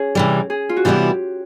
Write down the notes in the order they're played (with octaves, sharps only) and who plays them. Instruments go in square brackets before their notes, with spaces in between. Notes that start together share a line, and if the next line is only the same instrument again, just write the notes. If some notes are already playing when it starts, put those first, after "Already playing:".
Already playing: [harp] C#4 G#4
[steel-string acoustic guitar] C3 E3 G3
[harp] G#4
F4
F#4
[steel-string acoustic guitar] C3 E3 G3 B3 E4 [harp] G4